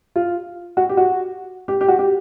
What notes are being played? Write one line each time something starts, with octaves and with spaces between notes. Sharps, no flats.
F4
F#4
G4
F#4
G4
G4
F#4
G4